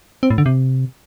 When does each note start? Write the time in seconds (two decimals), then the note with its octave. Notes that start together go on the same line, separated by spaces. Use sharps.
0.23 C4
0.30 A2
0.38 D3
0.46 C3